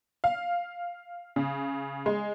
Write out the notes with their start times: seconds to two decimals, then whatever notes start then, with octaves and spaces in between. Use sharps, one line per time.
0.24 F5
1.36 C#3
2.06 G#3